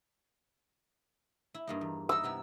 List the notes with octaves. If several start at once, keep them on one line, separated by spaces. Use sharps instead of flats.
E4
G2 A#3 D#4
E2
D#4 E4 E6
C3 B3 E4